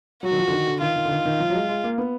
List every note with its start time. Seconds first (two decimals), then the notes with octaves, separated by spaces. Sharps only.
0.23 F#3 F#4
0.31 D#3
0.38 F3
0.48 D3
0.52 D#3
0.67 D3
0.81 D#3 F4
0.96 D#3
1.05 D3
1.11 D#3
1.25 D#3
1.40 F3
1.50 F#3
1.55 G#3
1.69 G#3
1.84 A#3
1.98 B3